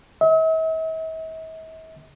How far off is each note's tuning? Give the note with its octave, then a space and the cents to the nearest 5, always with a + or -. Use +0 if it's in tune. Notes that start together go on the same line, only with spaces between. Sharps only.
E5 -45